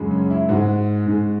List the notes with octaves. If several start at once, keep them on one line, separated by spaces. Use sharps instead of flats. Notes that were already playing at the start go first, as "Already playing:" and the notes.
Already playing: F#2 C#3 G#3
C#4
E4
G#2 G#3 F#4
G#2 G#3